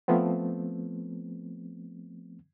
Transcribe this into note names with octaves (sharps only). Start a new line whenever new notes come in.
F3 A3 B3 C4